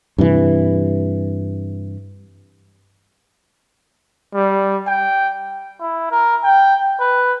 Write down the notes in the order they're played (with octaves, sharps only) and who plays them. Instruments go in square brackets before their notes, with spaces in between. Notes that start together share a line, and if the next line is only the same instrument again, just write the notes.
[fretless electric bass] G2 C3 E3
[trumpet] G3
G5
[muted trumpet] E4
A#4
G5
B4